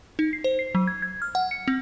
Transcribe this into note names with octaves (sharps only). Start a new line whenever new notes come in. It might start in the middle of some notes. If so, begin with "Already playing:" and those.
D#4
C7
C5
C7
F#3
G#6
G#6
F6
F#5
C#7
C4